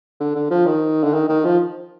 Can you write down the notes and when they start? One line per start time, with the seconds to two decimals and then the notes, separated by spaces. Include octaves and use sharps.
0.20 D3
0.35 D3
0.50 F3
0.66 D#3
1.04 D3
1.14 D#3
1.29 D#3
1.45 F3